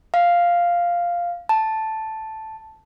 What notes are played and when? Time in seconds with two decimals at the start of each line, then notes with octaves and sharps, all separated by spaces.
0.14 F5
1.49 A5